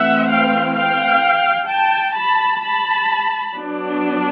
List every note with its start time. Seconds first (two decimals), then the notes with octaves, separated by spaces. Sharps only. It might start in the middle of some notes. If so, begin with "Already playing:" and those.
Already playing: E3 A3 C4 E5 F#5
0.30 F5 G5
0.77 F5 G5
1.69 G5 A5
2.16 A5 B5
2.63 A5 B5
3.56 F#3 B3 D4